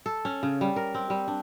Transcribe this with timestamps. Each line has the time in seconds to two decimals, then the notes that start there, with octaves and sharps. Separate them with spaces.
0.06 A4
0.25 C#4
0.43 C#3
0.61 G3
0.76 A#4
0.95 C4
1.10 G3
1.28 D4